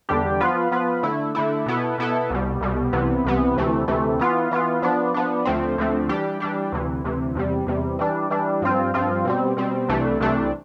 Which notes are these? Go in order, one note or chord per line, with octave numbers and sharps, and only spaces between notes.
E2 D3 G3 D4 G4
F3 B3 F4 B4
F3 B3 F4 B4
D3 A3 E4
D3 A3 E4
B2 B3 E4 A4
B2 B3 E4 A4
C2 B2 G3
C2 B2 G3
C2 C3 E3 B3
C2 C3 E3 B3
D2 C3 E3 A3
D2 C3 E3 A3
E3 B3 F4
E3 B3 F4
F3 B3 D4
F3 B3 D4
D2 D3 F3 A3 C4
D2 D3 F3 A3 C4
E3 G3 D4 G4
E3 G3 D4 G4
D2 C3 E3
D2 C3 E3
E2 C3 G3
E2 C3 G3
E3 G3 D4
E3 G3 D4
G2 F3 C4 F4
G2 F3 C4 F4
B2 G3 C4
B2 G3 C4
C2 C3 E3 A3 D4
C2 C3 E3 A3 D4